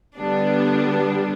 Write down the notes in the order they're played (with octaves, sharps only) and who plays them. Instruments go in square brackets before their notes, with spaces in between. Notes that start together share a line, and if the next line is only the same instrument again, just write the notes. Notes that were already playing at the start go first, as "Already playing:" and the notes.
[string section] D3 G3 B3 D4